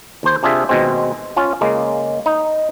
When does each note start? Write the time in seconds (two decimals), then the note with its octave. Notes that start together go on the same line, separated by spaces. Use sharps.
0.23 D#2 C5
0.43 C3 D4 F4 G#4 E5
0.69 D#2 B2 G#3 C4
1.36 C#4 F4
1.61 C#3 G#3 A#3
2.26 D#4